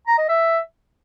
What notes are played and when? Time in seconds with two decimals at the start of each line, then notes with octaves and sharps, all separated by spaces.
0.07 A#5
0.18 D#5
0.29 E5